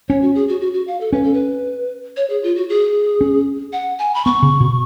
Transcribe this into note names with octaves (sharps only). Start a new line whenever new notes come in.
C#4 C#5
F#4
G#4
F#4
F#4
F#4
F5
A4
C#4 B4
A4
B4
C#5
G#4
F4
F#4
G#4
C#4
F#5
G#5
B5
B3 C#6
C#3
B2